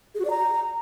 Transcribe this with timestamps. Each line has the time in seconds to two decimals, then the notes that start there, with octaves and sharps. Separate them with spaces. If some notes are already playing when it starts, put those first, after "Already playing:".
0.15 G#4
0.20 F#4
0.25 D5
0.30 A#5